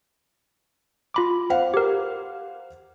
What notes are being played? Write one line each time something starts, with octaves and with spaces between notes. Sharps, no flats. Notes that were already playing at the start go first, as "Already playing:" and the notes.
F4 B5 D6
C5 F5 F#5
G4 A#4